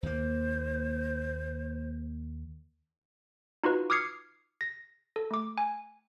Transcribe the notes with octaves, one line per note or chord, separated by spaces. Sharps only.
D#2 A#3 C5
D#4 F4 F#4 B4
D6 D#6 F6 G#6 C7 C#7
A#6
A4
A3 D6
G#5